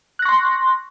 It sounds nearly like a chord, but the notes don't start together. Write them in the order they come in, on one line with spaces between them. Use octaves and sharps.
F#6 A#6 C#6 C6